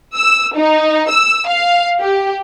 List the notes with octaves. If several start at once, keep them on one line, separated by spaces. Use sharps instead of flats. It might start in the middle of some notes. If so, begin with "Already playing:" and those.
E6
D#4
E6
F5
G4